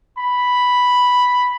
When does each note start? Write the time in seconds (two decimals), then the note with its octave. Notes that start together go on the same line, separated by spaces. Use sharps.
0.18 B5